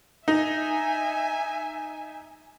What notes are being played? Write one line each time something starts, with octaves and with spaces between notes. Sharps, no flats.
D#4 E5 G#5